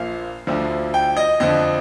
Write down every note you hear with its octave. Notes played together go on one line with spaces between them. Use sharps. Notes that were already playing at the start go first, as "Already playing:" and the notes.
Already playing: A#1 A#2 F3 A#3 F5
D2 D3 F3
G5
D#5
F2 D3 F3 D#5